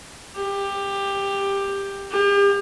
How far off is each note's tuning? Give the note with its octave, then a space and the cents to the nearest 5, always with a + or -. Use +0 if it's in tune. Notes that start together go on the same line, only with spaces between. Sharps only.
G4 +15
G4 +40